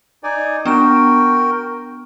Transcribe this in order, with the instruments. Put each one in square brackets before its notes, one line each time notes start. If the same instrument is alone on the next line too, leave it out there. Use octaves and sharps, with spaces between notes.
[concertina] D#4 D5 G#5
[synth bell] B3 D4 D7 [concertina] F#4 A#4 G5